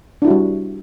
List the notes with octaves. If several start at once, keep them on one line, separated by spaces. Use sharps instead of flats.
G3 D4 E4 F#4